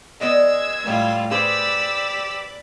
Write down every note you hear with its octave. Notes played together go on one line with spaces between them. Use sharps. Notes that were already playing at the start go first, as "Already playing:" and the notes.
G#3 B3 D5 D#5 E6 G#6
A2 G3 F4
G4 G#4 B4 C5 D5 B5 E6